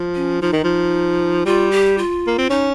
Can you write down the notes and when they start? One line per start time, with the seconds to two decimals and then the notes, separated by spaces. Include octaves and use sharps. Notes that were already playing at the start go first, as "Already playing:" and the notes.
Already playing: F3
0.15 C#4
0.41 F3 D#4
0.53 D#3
0.64 F3
1.45 G3 F4
1.71 G4
1.98 F4
2.27 A#3
2.38 C4
2.50 C#4 D#4